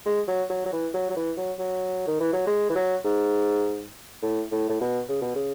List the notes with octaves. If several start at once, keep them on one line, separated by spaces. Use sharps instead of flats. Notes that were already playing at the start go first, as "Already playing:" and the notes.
G#3
F#3
F#3
F#3
E3
F#3
F#3
E3
F#3
F#3
D#3
E3
F#3
G#3
E3
F#3
G#2
A2
A2
A2
B2
C#3
B2
C#3